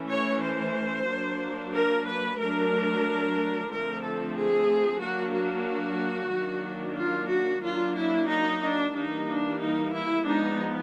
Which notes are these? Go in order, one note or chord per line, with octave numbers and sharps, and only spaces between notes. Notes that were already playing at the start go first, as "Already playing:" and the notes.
Already playing: E3 A3 C#4
C#5
C5
F#3 A#3 D4
A#4
B4
F#3 A3 D4 A#4
D3 F3 A3 C4 A#4
A4
G#4
F#3 A#3 D4 F#4
F#4
D#3 F#3 A#3 D4
F4
F#4
F#3 A#3 D4 F4
E4
D#4
D4
E3 G3 A#3 D4 D#4
D4
D#4
E4
F3 G#3 B3 D4 D#4